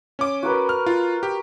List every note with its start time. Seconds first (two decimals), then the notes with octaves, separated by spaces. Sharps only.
0.19 C#4 D6
0.43 F#4 A#4 B4
0.69 F6
0.86 F4
1.23 G4